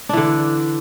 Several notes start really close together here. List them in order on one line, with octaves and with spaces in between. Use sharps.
D4 E3 D3